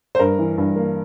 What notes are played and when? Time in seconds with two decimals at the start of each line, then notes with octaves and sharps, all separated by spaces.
0.15 C5
0.19 G2 A#4
0.39 E3
0.58 G2
0.76 A#3